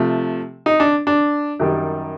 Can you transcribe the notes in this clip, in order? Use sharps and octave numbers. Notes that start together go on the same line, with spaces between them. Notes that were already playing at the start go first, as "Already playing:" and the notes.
Already playing: C3 F3 A3
D#4
D4
D4
F#2 D#3 G3